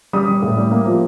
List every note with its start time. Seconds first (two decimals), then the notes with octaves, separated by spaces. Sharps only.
0.13 G3 D#6
0.29 G3
0.42 A2
0.57 G3
0.71 A#3
0.86 F3